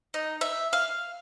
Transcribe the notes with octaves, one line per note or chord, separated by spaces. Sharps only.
D#4
E5
F5